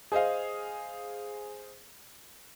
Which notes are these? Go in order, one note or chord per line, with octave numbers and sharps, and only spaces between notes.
G#4 C5 D#5 F5